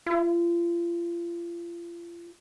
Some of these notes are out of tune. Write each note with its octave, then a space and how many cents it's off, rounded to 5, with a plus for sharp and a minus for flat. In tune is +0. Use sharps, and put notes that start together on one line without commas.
F4 -35